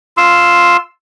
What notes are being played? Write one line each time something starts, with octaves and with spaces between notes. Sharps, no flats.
F4 C6 E6